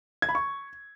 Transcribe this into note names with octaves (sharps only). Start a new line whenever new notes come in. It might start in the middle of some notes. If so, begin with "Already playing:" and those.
G#6
B5
C#6